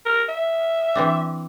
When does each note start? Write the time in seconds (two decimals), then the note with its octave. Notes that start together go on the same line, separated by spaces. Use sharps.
0.06 A#4
0.29 E5
0.95 E3 C4 D4